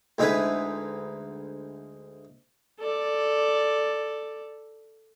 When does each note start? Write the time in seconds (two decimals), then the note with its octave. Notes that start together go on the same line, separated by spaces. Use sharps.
0.18 D2 G#3 D#4 E4 B4
2.79 A4 D5